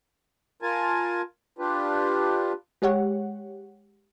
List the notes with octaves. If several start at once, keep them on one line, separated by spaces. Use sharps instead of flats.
F4 A#4 G#5 A5
D4 F4 G4 B4
G#3 G4 C#5 F#5